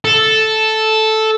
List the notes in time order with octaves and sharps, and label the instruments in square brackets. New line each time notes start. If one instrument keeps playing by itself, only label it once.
[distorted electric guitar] A4